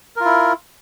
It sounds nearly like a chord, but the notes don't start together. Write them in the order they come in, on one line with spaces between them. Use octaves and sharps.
A#4 F4 E4